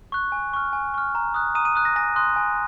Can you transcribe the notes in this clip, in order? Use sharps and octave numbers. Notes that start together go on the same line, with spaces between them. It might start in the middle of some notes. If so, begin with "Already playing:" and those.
C#6 F#6
G#5
C#6 F6
G#5
C#6 F6
A#5
D#6 F#6
A#5 D#6 D#7
D#6 D#7
D#6 F#6
A#6
G#5 A#6
C6 D#6 F#6
G#5